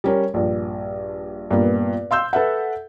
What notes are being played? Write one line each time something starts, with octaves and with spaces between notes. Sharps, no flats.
G3 C#4 A#4
A#1 G2
G2 A#2 A#3 B3
F5 C6 E6 G6
A4 B4 E5 F#5